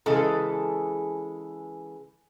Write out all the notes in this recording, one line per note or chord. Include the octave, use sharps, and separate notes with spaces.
C#3 E3 G#3 A4